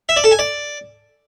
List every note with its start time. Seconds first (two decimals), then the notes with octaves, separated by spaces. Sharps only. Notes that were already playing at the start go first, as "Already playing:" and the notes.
0.09 E5
0.16 D5
0.24 A4
0.31 G#5
0.39 D5